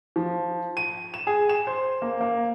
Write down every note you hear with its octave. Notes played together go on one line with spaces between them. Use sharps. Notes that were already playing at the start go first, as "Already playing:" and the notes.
F3
D#7
E7
G#4
E7
C5
A#3
A#3